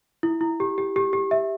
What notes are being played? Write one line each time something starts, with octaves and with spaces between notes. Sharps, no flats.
E4
E4
G4
G4
G4
G4
E5